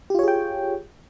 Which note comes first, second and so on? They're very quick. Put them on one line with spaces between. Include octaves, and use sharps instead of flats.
G4 F4 C#5 G#4 G5